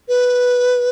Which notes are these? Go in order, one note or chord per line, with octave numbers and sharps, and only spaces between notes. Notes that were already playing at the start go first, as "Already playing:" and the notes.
B4